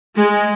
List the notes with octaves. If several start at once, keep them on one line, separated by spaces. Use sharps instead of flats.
G#3